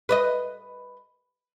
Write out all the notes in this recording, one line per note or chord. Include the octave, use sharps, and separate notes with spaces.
B4 C#5 D#5